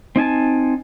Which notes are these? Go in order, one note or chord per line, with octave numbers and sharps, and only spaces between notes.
C4 D#4 G#5 A5